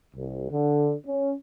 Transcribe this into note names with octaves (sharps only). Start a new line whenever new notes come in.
C2
D3
C#4